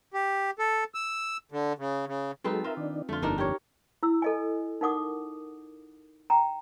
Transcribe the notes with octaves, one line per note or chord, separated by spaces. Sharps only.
G4
A4
E6
D3
C#3
C#3
F#3 G#3 C4 D#4 A4 B4
F4 A#4 E5
D#3 D4
F2 D3 A3 F4
G1 D4 D#4 A#4
G4 A#4 C#5
E4 E6
A4 D#5 G#5
D#4 A#4 F#5 D6 D#6
G5 A#5